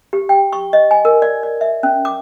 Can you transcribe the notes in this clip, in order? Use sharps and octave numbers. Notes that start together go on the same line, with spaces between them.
G4
G5
C#6
D#5
G#5
A#4
D5
D5
E5
C#4
D6